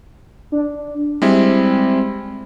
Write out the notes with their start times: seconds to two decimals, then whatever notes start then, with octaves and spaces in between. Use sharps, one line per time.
0.52 D4
1.22 G3 G#3 C4 E4